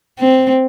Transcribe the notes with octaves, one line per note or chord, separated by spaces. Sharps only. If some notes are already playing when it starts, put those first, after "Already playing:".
C4